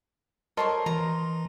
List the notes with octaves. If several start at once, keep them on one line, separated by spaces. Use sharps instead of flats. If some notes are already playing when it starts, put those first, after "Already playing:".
A4 A#4 C5 C#5 D#5 C6
E3 A#5